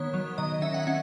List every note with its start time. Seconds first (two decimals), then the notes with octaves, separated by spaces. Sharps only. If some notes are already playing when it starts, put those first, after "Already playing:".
Already playing: D#3 B3 C#5
0.14 F#3
0.38 D#3 D#5
0.62 C#4 E5
0.74 F#5
0.87 C#4 F#5